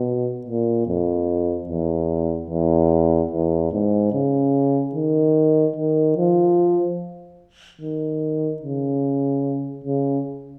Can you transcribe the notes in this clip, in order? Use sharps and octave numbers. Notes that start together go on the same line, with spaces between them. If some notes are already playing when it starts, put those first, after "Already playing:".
Already playing: B2
A#2
F2
E2
E2
E2
G#2
C#3
D#3
D#3
F3
D#3
C#3
C#3